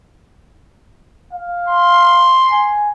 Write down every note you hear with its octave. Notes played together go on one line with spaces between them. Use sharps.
F5
C6
G#5